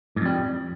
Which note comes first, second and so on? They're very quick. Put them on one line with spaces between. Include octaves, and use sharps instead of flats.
G#2 F2 G3